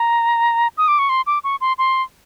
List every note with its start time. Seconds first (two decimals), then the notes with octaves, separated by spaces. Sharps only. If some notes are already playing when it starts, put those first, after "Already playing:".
Already playing: A#5
0.77 D#6
0.88 D6
0.99 C#6
1.09 C6
1.27 D6
1.44 C#6
1.61 C6
1.78 C6